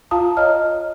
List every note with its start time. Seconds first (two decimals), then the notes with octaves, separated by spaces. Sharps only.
0.11 F4 F5 A5 A#5 D#6
0.37 C#5 D#5 F5 A#5 F6